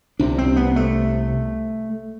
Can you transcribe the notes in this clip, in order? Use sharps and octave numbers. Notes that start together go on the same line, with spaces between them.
C2 C3 D4
C4
B3
A3